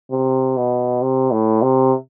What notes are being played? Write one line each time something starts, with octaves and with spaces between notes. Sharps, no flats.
C3
B2
C3
A2
C3